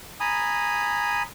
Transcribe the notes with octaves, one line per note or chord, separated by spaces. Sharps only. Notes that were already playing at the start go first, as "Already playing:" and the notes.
G#5 A#5 B5 D#6